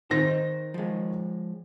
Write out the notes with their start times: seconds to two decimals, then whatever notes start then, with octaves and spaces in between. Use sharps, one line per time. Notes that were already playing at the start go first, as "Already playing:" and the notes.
0.11 D#3 D#4 C5 A#6
0.74 F3 G#3